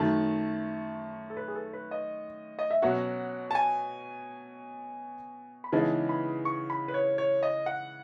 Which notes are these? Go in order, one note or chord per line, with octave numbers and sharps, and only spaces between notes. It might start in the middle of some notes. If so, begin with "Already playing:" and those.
Already playing: F#2 D#3 A3 A5
A4
B4
G#4
A4
B4
D#5
D#5
E5
B2 F#3 C#4 F#4 F#5
A5
G#5
B5
C#3 E3 G#3 B3 D#4 A5
B5
C#6
B5
B4
C#5
C#5
D#5
F#5